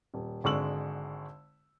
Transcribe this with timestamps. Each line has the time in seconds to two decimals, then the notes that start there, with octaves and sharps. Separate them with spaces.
0.14 D#1
0.44 G#1 D3 G#3 C#6 E6 F#7